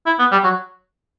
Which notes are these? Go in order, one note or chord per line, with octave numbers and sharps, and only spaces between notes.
E4
B3
G3
F#3